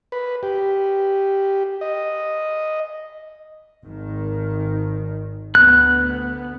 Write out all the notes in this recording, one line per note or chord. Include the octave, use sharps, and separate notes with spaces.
B4
G4
D#5
G#1 D#3
D2 B3 F#6